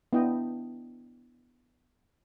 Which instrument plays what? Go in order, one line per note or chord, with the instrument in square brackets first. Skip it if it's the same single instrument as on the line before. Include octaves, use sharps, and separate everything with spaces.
[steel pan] B3 D4 E4 D#5 G5